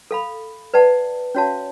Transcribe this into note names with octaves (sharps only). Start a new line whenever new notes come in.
A4 F5 B5
B4 D5 F#5 A5
C#4 F#4 C#5 F5 A5